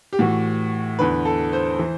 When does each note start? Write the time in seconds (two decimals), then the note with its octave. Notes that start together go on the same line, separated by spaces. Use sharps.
0.13 G4
0.19 A2 E3 F#4
0.99 E2 D3 B4
1.25 A4
1.53 C5
1.79 E3